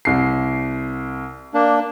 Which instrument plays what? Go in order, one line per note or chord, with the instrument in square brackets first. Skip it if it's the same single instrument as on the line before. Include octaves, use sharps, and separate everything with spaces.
[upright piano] C2 C7
[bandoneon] A#3 D4